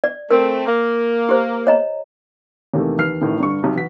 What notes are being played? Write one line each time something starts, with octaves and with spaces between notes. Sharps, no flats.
D5
A3 C4 A#4
A#3
G4 C5
C#5 D#5 A#5
E2 C3 D#3 A3 A#3
D#2 E3 F6 C7
A1 A2 D#3
G2 D3 C#6
B1 C3
E3 F#4 B6